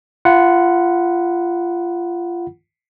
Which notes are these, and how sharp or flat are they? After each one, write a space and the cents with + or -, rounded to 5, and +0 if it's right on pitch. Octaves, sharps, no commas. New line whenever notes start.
F4 -25 F#5 +0 B5 -25